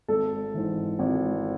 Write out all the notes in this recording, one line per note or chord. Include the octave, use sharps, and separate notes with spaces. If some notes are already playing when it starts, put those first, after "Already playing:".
G#1 A4
G#2 E3
G#1